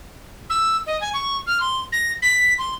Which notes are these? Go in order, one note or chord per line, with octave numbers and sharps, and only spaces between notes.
E6
D#5
G#5
C#6
F6
C6
A#6
B6
C6